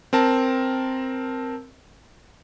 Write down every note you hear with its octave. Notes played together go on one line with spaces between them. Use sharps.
C4 A#4 A5